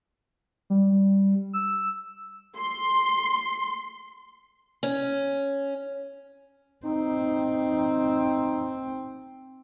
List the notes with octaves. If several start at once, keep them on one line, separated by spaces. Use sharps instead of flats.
G3
E6
C6
C#4
C4 D#4